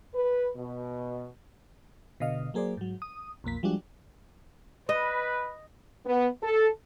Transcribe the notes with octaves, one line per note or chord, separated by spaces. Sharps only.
B4
B2
B2 D3 D#5 F5
F#3 A#3 G#4 C5 D5
G#2 F#3
D#6
B1 F2 A#3 B6
F3 G3 G#3 D4 F#4
B4 D#5
B3
A4